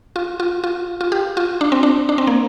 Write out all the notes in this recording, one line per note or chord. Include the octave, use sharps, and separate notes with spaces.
F4
F4
F4
F4
G4
F4
D4
C4
D4
D4
C4
A#3